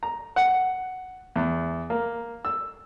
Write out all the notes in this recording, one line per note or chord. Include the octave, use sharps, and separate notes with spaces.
A#5
F#5
E2
A#3
E6